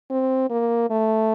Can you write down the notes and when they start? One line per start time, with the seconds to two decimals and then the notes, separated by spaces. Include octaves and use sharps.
0.10 C4
0.50 A#3
0.90 A3